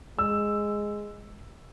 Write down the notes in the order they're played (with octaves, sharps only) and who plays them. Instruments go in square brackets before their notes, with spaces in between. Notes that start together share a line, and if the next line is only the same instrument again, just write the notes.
[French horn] G#3 [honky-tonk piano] E6